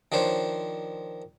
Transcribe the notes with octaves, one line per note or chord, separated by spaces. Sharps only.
D#3 F3 D4 C5 C#5